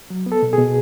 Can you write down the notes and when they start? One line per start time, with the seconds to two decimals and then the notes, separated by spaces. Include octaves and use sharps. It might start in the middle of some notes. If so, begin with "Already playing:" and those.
0.10 F#3
0.26 B3
0.32 A4
0.43 B2
0.53 B2 G#4